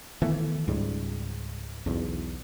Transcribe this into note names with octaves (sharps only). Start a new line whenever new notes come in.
D#3 E3 A3 B3
C#2 G#2 G3
B1 E2